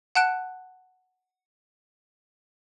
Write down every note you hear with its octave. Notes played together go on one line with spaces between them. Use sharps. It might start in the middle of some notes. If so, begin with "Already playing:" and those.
F#5 A5 F#6 D7